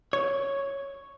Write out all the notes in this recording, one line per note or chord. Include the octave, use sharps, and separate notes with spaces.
C#5